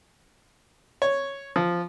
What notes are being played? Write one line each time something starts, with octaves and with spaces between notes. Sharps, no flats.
C#5
F3